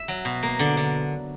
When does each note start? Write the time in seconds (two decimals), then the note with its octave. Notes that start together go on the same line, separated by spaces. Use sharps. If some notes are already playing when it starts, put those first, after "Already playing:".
Already playing: E5
0.08 F#3
0.25 B2
0.43 A#3
0.59 D3 D5
0.77 D3